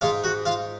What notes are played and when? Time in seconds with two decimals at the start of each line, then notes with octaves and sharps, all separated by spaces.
0.01 G#2 F4
0.24 F#4
0.46 F4